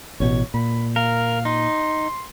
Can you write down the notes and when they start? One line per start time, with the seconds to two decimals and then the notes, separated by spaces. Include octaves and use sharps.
0.20 A1 B2 C#5
0.54 A#2 B5
0.96 A#4 F5
1.45 D#4 C6